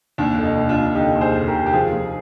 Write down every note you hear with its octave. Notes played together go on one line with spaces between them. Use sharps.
D#2 D4
F1 D4
D#4
F1
D4 F4
D#2
D3 D#4 G4
D#2
G#4 C5
F1
G4 A#4
F1
G4
F3 F4 G#4
F3